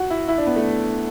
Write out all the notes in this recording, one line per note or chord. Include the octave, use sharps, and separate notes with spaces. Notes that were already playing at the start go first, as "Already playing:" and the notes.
Already playing: F#4
E4
E4
D4
B3
A3